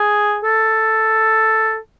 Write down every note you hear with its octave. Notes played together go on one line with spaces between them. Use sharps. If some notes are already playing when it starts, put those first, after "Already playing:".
Already playing: G#4
A4